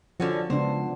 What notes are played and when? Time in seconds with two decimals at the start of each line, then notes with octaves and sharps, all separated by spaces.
0.20 D3 F3 C#4 F#4
0.50 C#3 G#3 B3 D4 C5